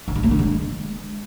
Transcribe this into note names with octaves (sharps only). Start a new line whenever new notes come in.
D3
D4
A#3
D3
G#3